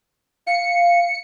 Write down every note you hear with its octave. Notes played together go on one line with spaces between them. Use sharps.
F5 C#7